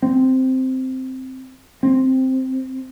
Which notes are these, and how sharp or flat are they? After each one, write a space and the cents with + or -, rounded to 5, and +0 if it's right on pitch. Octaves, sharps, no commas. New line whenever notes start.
C4 -5
C4 +0